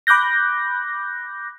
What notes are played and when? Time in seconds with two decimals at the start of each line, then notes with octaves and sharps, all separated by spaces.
0.07 B5 D6 F#6 G6 A#6